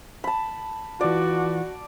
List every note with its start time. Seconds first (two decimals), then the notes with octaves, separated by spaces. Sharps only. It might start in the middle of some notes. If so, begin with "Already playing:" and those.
0.24 A5 B5
1.01 E3 F4 F#4 D5